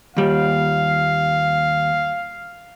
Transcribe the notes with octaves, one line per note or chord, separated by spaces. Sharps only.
D#2 G3 F5